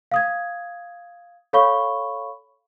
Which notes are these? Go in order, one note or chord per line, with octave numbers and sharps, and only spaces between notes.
F5 D#6 G#6
A4 C#5 F5 B5 C#6 G7